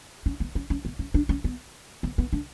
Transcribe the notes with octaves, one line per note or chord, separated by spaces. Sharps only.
C#4
B3
C#4
C#4
B3
C#4
D4
C#4
B3
B3
B3
D4